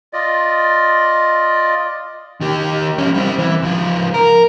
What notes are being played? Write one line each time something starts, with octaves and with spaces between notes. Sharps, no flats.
F4 D5 D#5
D#3 G4
F3 C#4
G3 C4
E3
C#2 F3
A#4